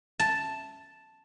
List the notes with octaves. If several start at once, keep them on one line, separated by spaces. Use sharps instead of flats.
A5